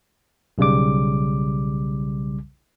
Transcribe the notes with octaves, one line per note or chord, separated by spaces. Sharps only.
B1 C#3 G3 D6